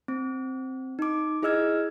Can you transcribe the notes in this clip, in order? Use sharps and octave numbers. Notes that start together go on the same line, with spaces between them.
C4
D#4 D6
E4 G#4 D#5 E6 F6 G#6